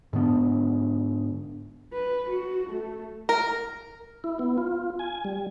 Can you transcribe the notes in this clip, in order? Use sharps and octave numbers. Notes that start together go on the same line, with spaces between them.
G#2 D3 B3 D4
B4
F#4
A3
A#4
E4
B3
F4
G#5
G3